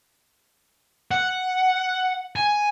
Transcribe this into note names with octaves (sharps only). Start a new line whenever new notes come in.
F#5
G#5